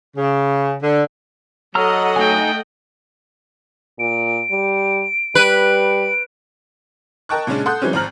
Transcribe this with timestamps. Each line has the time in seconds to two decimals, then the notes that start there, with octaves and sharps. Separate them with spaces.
0.17 C#3
0.82 D3
1.75 F#3 A4 D#5 F#5 A#5 E6 F6
2.16 A3 D#4 G5 G#5
3.99 A#2 D7
4.51 G3
5.35 G3 B4
7.29 A#4 D#5 G5 A5 C#6 F#6
7.47 A#2 C#3 G#3 C#4 D4
7.66 A4 F#5 C6 D#6 F#6 G6
7.82 E3 F#3 G#3 C4 C#4
7.93 G#1 F3 C4 A#5 F6 F#7